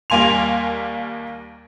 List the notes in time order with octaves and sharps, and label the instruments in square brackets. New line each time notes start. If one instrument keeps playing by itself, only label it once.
[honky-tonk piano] D#2 G3 A#3 G#5 C6 F7